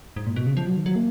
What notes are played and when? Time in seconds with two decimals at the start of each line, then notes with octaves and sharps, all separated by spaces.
0.16 G#2
0.26 A#2
0.36 B2
0.46 C#3
0.57 F3
0.66 F#3
0.76 D#3
0.86 F#3
0.96 A#3